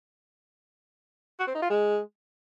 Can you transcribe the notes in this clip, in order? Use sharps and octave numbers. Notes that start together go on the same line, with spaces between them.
F#4
C4
D#4
F4
G#3